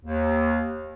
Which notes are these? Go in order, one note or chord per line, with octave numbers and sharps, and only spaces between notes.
D#2